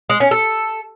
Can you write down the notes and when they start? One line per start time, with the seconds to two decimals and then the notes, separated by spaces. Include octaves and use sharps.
0.10 G#3
0.20 C#4
0.31 A4